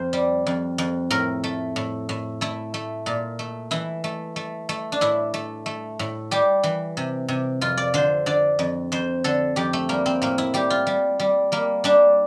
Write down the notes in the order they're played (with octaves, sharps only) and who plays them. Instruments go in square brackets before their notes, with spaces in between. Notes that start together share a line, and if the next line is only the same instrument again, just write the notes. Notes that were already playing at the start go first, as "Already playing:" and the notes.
Already playing: [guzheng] F2 C5
G3
F2
F2
A2 A#4
A3
A2
A2
A3 E4
A3
A#2
A3
E3 E4
A3
A3
A3
D4
A2 E4
A3
A3
A2
G3 G4
E3
C3
C3
F2 F4
D5
D3 C5
D3 D5
F2
F2 C5
D3 A4
F2 G4
A3
G3 A#3
C4
A2 A#3
E4
G3 G4
F4
G3
G3
G3 A#3
G3 D4